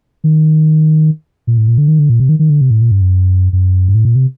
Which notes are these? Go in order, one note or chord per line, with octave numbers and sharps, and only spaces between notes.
D#3
A#2
A2
A#2
D3
D#3
D3
A#2
C3
D#3
D#3
D3
C3
A2
A#2
G2
F#2
F#2
G2
A2
A#2
C3